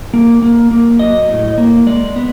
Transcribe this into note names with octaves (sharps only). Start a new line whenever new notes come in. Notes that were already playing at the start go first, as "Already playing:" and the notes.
A#3
A#3
A#3
F#3 D#5
A2
A#3
G#3 D5
B3